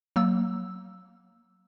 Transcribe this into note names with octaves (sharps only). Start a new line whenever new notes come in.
F#3 A#3 E6